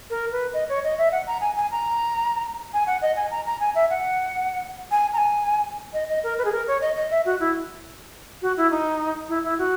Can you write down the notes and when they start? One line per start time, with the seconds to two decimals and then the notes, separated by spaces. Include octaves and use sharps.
0.10 A#4
0.32 B4
0.54 D#5
0.69 C#5
0.84 D#5
0.98 E5
1.12 F#5
1.27 A#5
1.41 G#5
1.56 G#5
1.71 A#5
2.73 G#5
2.87 F#5
3.02 D#5
3.16 G#5
3.31 A#5
3.46 A#5
3.60 G#5
3.75 E5
3.90 F#5
4.91 G#5
5.13 A#5
5.18 G#5
5.93 D#5
6.09 D#5
6.23 A#4
6.38 B4
6.45 G#4
6.52 A#4
6.67 C#5
6.81 D#5
6.96 D#5
7.11 E5
7.25 F#4
7.40 E4
8.42 F#4
8.57 E4
8.71 D#4
9.29 E4
9.44 E4
9.58 F#4